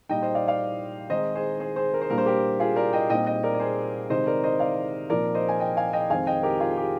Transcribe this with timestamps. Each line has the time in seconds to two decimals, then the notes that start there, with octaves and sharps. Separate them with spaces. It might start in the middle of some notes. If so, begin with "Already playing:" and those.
0.09 A#2 G3 A#3 D#4 D#5 G5
0.22 C5 D#5
0.35 D5 F5
0.48 D5 F5
1.10 D#3 G#3 C4 D#4 C5 D#5
1.35 G#4 C5
1.60 G#4 C5
1.76 G#4 C5
1.94 A#4
2.02 C5
2.10 A#2 G3 A#3 D4 A#4
2.18 C5
2.26 G4 A#4
2.60 F4 G#4
2.76 A#4 D5
2.93 D#5 G5
3.10 A#2 G3 C4 D#4 D#5 G5
3.26 D#5 G5
3.43 A#4 D5
3.54 D5
3.60 G#4 C5
4.10 C3 D#3 G#3 D#4 C5 D#5
4.27 A#4 D5
4.44 C5 D#5
4.59 D5 F5
5.10 A#2 F3 C4 D#4 A#4 D5
5.35 C5 D#5
5.49 G#5
5.60 D#5 G5
5.77 F5 G#5
5.93 D#5 G5
6.10 F2 D#3 G#3 C4 F5 G#5
6.27 D#5 G5
6.43 G4 A#4
6.60 F4 G#4
6.72 G#4
6.77 G4